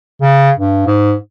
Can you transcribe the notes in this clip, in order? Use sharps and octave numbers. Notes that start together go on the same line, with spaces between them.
C#3
G2
G#2